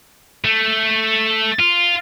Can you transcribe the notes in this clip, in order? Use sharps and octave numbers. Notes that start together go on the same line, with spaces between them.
A3
F4